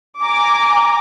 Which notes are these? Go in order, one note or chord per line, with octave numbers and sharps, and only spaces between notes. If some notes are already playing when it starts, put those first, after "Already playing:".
G#5 A#5 D6